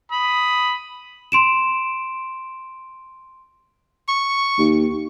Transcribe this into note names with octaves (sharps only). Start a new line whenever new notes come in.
B5 D#6
C6 D7 E7
C#6
D#2